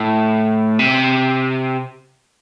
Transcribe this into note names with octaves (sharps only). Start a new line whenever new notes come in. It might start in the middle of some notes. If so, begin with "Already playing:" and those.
Already playing: A2
C3